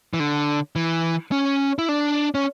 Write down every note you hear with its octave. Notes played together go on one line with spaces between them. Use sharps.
E3
D3
E3
C#4
E4
D4
C#4